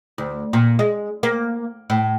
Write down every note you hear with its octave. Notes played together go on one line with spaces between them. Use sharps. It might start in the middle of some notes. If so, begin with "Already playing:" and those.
D2
A#2
G#3
A#3
A2